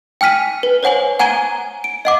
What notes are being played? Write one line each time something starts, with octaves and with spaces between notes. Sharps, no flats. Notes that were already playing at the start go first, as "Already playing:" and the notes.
G5 G#5 F6 B6 D#7
B4
C5 C#5 F#5 G#5 F#7
F#5 G#5 A#5 G#6 D#7 G7
D7
D#5 F#5 D6